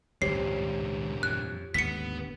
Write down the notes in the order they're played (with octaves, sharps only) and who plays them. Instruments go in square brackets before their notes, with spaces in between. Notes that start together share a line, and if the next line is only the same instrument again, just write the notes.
[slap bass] G#1 C#2 [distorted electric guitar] G2 A#2 [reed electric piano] G4 C5 C#5 [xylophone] C7
[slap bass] F2 [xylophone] F#6
[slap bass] G#1 D#2 D3 [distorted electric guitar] B3 [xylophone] B6 C#7